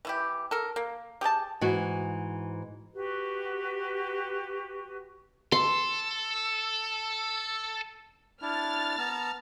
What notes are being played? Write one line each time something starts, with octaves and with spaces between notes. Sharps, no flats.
E3 E4 G4
A4 A#4
A#3
G4 G#4 C5 A5
G#2 E3 F#4
F#4 G4 B4
A4 C6
D4 E4 F6 A6
B3 A5 A#5